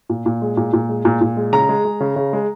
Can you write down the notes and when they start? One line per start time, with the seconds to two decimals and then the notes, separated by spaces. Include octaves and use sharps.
0.09 A#2
0.26 A#2
0.42 G#3
0.57 A#2
0.73 A#2
0.89 G#3
1.05 A#2
1.21 A#2
1.37 G#3
1.53 C#3 A#5
1.69 G#3
1.85 G#3
2.00 C#3
2.16 C#3
2.33 G#3